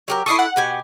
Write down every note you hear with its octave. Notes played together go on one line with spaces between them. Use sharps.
F#3 G4 A#4
E4 F#4 A4 C#6 D#6 C7
F#5
B2 G4 G#5